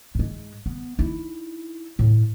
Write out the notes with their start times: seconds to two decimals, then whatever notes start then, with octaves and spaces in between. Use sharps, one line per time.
0.15 G#2 G#3
0.66 B3
0.99 D#4 E4
1.99 A2